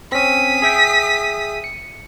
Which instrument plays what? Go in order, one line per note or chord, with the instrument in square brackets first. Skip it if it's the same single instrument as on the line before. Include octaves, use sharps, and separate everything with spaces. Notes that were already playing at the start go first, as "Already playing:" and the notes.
[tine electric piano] C4 C#4 [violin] D#6 B6
[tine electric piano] G#4 E5 G5
C#7